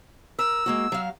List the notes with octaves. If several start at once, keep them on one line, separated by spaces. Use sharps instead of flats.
A#4 E6
G#3 A#3 F#4
F#3 F5